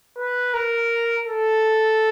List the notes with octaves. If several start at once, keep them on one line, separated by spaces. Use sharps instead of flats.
B4
A#4
A4